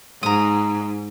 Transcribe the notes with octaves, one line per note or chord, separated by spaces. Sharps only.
G#2 A#5 D#6